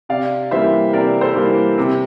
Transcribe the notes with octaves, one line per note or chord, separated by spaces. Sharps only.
C3 D5 F5
E3 G3 A#3 C5 E5
C3 A#4 D5
A4 C5
E3 G3 A#3
C3